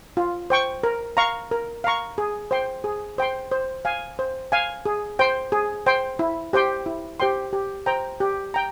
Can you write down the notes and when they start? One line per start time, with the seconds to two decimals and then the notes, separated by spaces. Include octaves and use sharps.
0.17 F4
0.50 C5 G5 C#6
0.83 A#4
1.17 F5 A#5 C#6
1.51 A#4
1.84 F5 A#5 C#6
2.18 G#4
2.51 C5 G5 C6
2.84 G#4
3.18 C5 G5 C6
3.52 C5
3.85 F5 G#5
4.19 C5
4.52 F5 G#5
4.86 G#4
5.19 C5 G5 C6
5.52 G#4
5.86 C5 G5 C6
6.19 E4
6.53 G4 C5 G5 C6
6.86 E4
7.20 G4 C5 G5 C6
7.53 G4
7.86 C5 G5 A#5
8.20 G4
8.54 G5 A#5